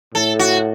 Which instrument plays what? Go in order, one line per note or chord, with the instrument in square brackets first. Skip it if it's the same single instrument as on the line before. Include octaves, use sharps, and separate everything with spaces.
[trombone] A2 [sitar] A4
[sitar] F#4